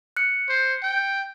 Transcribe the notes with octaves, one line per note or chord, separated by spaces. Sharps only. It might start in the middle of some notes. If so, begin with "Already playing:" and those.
F#6 C#7
C5
G5